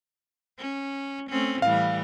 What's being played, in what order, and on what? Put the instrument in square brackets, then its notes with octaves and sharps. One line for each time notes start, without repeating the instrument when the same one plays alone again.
[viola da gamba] C#4
A3 C4 C#4
[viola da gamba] A2 E3 G3 [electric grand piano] F5